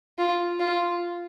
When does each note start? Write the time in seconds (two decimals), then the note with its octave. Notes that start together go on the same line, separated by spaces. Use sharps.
0.18 F4
0.60 F4